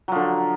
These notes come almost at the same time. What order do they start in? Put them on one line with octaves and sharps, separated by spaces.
F#3 F3 D3